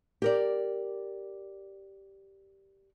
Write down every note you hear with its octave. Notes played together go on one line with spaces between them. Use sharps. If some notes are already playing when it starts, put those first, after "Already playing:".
G4 A#4 D5